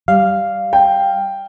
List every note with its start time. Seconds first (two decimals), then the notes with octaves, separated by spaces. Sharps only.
0.08 G3 F5
0.73 G5